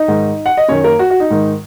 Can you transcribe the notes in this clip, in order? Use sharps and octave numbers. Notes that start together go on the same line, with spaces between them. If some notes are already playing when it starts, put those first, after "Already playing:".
Already playing: D#4 D#5
G#2 D#3
F#5
D#5
F#2 D#3 C#4 C#5
A#3 A#4
F#4
F#4
D#4
G#2 D#3